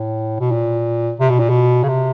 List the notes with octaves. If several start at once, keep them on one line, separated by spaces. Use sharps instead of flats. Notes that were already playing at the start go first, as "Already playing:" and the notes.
Already playing: A2
B2
A#2
C3
B2
A#2
B2
C#3
C3